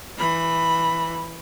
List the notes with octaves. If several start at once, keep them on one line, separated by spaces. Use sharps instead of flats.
E3 B5